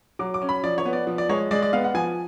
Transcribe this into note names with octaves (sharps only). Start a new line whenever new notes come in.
F#3 D6
D6
C#4
B5
F3 D5
C#5
B3
D5
F3
D5
G#3 C#5
G#3 D5
D5
B3 F5
F#5
F3 G#5